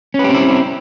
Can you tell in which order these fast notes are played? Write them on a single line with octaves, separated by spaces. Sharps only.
C#4 B4 G4 C4 E4